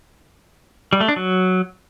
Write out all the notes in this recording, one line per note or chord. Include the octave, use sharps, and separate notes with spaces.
G3
A3
D4
F#3